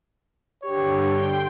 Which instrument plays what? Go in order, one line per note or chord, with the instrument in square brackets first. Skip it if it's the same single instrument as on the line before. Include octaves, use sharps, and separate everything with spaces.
[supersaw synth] G2 D3 [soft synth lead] G4 [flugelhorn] C#5
[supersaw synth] G5 C6